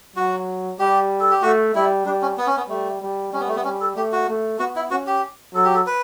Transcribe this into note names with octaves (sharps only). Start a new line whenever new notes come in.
F#3 F#4
G3 G4
A4
G4
A3 F#4
G3 E4
G3 D4
C#4
B3
C#4
B3
G3 A3
G3
G3 C#4
B3
A3
B3
G3 C#4
A4
A3 G4
F#4
A3
B3 F#4
E4
C#4 F#4
G4
F#3 A4
G4
A4
B4